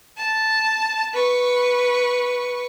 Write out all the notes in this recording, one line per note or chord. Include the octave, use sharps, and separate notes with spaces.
A5
B4 C#6